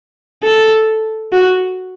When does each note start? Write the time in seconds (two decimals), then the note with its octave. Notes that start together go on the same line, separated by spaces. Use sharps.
0.43 A4
1.32 F#4